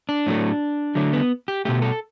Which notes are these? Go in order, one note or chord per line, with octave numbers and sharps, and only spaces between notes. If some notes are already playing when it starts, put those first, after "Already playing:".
D4
A2 F#3 A3
D3 F#3 A3
B3
G4
B2 A3 G4
A4